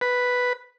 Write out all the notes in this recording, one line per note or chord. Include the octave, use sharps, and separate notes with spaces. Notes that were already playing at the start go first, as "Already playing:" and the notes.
B4